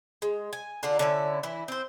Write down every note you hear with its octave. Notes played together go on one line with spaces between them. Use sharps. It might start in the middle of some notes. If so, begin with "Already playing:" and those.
G#3
G#5
D3 D4 F4
D3 C#4 E4
E3 E4
C4 C5